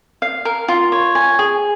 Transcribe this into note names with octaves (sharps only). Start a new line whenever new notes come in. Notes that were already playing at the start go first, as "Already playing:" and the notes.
F5
A#4
F4
C#5
G#5
G#4